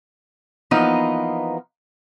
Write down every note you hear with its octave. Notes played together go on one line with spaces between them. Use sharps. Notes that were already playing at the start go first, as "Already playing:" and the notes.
E3 F3 A#3 B3 D#4